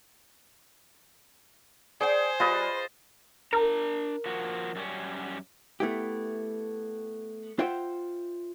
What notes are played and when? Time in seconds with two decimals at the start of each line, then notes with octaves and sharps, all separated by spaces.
2.01 G#4 C5 D5 G5
2.40 G3 F4 G#4 B4 D#5
3.53 D4 A#4 A#5
4.26 F3 A#3 F#4
4.75 F#2 G3 C#4
5.80 A3 B3 E4 G4
7.59 F4 C5 E5 F#5 G5